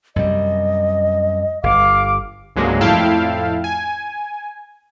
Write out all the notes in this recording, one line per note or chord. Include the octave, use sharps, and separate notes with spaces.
F#2 C3 G3 D#5
G1 F5 D6
C2 G2 C#3 F#3 G#3 A#3
F2 A2 E4 F5 G5 A5
G#5